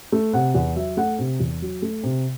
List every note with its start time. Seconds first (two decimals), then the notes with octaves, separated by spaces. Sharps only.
0.12 A3
0.33 C3 F#5
0.54 E2 F#5
0.76 F#3 E5
0.97 A3 F#5
1.19 C3
1.40 E2
1.62 F#3
1.82 A3
2.04 C3